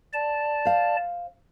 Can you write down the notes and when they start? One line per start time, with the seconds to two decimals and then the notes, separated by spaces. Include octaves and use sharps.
0.13 D5 A5
0.65 C5 F5